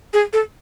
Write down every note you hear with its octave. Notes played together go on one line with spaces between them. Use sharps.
G#4
A4